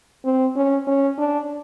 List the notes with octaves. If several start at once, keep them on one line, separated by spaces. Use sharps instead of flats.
C4
C#4
C#4
D4